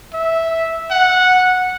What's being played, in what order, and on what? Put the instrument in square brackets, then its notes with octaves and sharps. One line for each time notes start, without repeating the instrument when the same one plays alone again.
[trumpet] E5
F#5